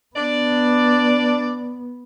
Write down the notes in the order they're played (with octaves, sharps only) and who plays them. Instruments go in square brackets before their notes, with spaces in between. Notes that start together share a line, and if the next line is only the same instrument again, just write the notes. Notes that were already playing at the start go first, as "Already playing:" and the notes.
[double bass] B3 [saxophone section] D4 D5